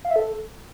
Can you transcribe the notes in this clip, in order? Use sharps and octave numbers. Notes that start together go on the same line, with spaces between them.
F5
E5
A4